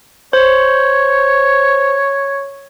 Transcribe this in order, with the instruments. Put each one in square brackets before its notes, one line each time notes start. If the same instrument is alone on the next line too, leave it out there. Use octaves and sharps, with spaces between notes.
[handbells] C5 [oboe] C#5